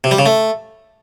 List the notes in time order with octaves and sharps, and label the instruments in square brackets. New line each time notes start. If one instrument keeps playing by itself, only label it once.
[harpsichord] C3
G3
C#3
A3